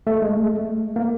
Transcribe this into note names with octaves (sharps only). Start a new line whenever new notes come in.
A3
G#3
A3
A#3